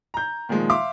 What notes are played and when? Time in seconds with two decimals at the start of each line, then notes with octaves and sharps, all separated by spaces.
0.14 A#5 G6
0.49 A#2 D#3 F3 G#3
0.70 E5 F5 C6 D6